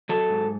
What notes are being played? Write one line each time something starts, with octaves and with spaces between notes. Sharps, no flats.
F#3 A4
G#2